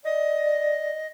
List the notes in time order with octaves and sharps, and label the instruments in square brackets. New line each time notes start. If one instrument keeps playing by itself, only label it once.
[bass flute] D5 [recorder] D#5